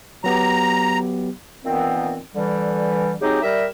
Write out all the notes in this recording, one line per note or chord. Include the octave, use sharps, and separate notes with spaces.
F#3 B3 G4 A#5
A#2 D#3 E3 B3 C4
D3 E3 G3
F#3 G#3 C4 D#4 G4 G#4
G3 A#4 E5